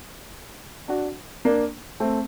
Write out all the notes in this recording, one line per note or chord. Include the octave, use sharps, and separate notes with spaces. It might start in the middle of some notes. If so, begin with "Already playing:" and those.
D4 F#4
A#3 D4
A3 C4